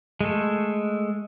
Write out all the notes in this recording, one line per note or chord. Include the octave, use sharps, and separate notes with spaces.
G#3 A3 A4